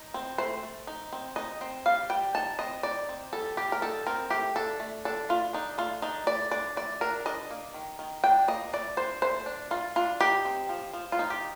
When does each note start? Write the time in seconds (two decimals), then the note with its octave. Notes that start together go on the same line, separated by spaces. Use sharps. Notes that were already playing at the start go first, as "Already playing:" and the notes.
Already playing: D#4
0.14 C4
0.38 A3 C5
0.63 A3
0.87 D#4
1.13 C4
1.36 D#4 D#5
1.61 C4
1.86 G3 F5
2.10 G3 G5
2.35 D#4 A5
2.59 C4 D#5
2.83 D#4 D5
3.09 C4
3.33 G3 A4
3.57 G3 G4
3.72 A#4
3.82 D#4 A4
4.07 C4 A#4
4.30 A3 G4
4.56 D4 A4
4.80 A3
5.05 D4 A4
5.29 A3 F4
5.53 D4 D#4
5.78 A3 F4
6.02 D4 D#4
6.27 A3 D5
6.51 D4 D5
6.77 A3 D5
7.01 D4 A#4
7.26 D4 D#5
7.51 A#3
7.74 D#3
7.99 D#3
8.24 D4 G5
8.48 A#3 D#5
8.73 A3 D5
8.97 D4 C5
9.22 A3 C5
9.46 D4
9.71 A3 F4
9.96 D4 F4
10.21 D#4 G4
10.45 C4
10.69 F3
10.93 F3
11.12 F4
11.19 D#4
11.30 G4